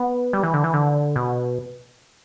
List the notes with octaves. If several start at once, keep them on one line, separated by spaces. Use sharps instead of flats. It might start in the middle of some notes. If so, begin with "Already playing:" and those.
Already playing: B3
G3
E3
D3
E3
D3
B2